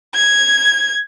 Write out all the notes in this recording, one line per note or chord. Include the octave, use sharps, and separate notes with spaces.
G#6